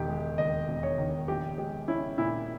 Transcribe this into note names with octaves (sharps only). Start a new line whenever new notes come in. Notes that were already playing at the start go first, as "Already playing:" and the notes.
Already playing: E1 D#3 G4
G#3
D#2 D#5
E1
C#5
D#3
A#1 G4
G#3 G4
C#4 E4
A#2 E4